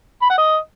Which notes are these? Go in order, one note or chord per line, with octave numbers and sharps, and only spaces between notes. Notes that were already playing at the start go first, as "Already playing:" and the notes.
B5
F#5
D#5